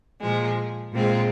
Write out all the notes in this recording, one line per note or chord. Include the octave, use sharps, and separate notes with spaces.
A#2 F3 G#3
A#2 G#3 C4 F4